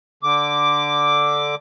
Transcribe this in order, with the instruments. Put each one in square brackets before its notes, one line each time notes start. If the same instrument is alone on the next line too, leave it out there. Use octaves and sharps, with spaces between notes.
[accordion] D3 D6